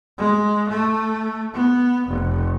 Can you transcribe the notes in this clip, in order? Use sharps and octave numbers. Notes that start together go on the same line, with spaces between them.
G#3
A3
B3
F1